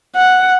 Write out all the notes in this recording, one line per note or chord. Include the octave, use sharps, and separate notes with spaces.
F#5